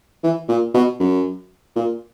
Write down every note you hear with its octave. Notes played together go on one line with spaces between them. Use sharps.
E3
A#2
B2
F#2
A#2